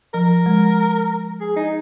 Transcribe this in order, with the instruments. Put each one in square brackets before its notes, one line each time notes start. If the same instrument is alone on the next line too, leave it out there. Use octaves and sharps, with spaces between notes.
[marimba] F3 [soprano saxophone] A#4
[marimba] G#3
[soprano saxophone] G#4
D#4